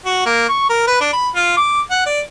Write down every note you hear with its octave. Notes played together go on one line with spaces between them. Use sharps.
F#4
A#3
C#6
A#4
B4
D4
B5
F4
D6
F#5
D5